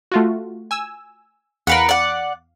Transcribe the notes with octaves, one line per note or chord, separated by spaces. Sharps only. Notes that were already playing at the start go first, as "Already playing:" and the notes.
A3 F4 F#4
G#5 E6
E2 A#4 B4 F5 F#5
D5 F#5